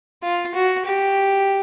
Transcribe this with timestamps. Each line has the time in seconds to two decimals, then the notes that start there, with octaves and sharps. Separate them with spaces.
0.23 F4
0.55 F#4
0.86 G4